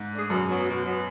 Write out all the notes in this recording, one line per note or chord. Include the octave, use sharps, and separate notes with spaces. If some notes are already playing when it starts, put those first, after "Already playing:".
Already playing: G#2
A3 D4 G#4
F#2 B2
F#3 B3
B2
F#3 B3